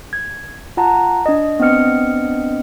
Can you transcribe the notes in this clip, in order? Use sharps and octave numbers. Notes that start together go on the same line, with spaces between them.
G#6
F4 F#5 A5 A#5
D4 D#5
B3 C4 D4 D#5 F6 C#7